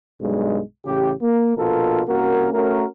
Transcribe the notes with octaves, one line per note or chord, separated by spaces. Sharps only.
B1 G2 G#3
A1 C#3 G4
A#3
A#1 B2 F4 A4 A#4
C2 A#3 C#4 F#4 A#4
A3 C#4 F#4 A#4